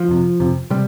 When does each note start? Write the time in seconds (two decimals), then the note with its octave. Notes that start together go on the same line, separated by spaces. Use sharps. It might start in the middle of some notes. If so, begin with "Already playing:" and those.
Already playing: F3
0.08 F2 C3
0.40 F2 C3
0.70 C3 G3